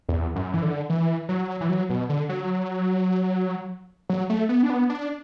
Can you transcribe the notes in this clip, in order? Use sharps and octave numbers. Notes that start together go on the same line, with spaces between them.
E2
F#2
E3
D3
E3
F#3
E3
F#3
B2
D3
F#3
F#3
A3
B3
D4
B3
D4